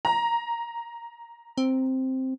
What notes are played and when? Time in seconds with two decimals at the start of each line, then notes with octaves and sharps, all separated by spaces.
0.05 A#5
1.58 C4